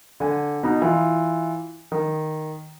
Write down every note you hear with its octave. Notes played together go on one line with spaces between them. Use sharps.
D3 G#5
B2 D#4
E3 F4
D#3